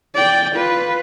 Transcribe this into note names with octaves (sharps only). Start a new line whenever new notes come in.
D5 G5
F4 B4